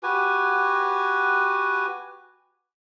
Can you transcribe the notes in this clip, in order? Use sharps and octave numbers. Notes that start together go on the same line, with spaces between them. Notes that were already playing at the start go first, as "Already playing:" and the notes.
F#4 G4 B4 G#5